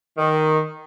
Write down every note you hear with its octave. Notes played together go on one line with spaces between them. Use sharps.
D#3